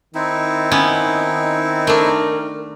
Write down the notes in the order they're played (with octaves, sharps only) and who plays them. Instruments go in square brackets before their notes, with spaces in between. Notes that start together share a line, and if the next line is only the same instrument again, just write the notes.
[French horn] D#3 [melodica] C4 D#4 E4
[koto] B3 C#4
[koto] A3 D4 [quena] A#4